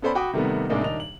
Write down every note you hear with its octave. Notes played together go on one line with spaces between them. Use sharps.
B3 C#4 A4 C5 D5 B5
F#4 G5 B5 D6 D#6
C3 D#3 G3 A3 B3
A2 C3 G#3 A#3 D4 D#4
D#1 D#3 D4 D5 D#5 F7
F#7